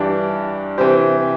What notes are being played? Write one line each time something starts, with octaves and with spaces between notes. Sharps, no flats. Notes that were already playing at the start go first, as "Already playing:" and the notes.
Already playing: G2 E3 D4 G4
C3 E3 G4 C5